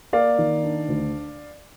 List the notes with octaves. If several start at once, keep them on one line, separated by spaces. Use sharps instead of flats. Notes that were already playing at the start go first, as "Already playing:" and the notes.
A#3 D5 F5
D#3
D4
D2